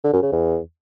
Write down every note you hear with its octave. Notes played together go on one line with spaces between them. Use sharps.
D3
F#2
C#3
E2